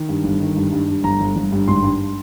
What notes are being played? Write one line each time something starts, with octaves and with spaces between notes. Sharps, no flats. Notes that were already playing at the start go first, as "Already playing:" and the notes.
Already playing: D#3
G2
G1
D#3
G2
G2
G2
G1 A#5
G1
G1
G2
G#1 C6
G2